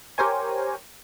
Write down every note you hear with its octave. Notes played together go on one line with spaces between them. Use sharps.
G4 A#4 C5 C#5 G#5